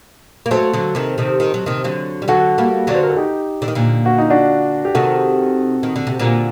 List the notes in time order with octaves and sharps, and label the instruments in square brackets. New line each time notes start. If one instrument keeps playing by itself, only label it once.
[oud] A#3
[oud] F#3 A3 [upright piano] A4 C5
[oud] D3 F#3
C3 D#3
C3 D#3
D#3
F#3
C3 D#3
D3 F#3
G3
[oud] D3 F#3 [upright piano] F#4 A4
[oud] G3 A#3
[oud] D3 F#3 [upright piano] D5
[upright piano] C5
A#4
A4
D#4 G4
[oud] D3
D#3
A#2 D3
[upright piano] F#4
D#4
D4 F#4
G4
[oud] C3 D#3 [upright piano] F#4 A4
[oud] D#3
D3
C3
A#2 D3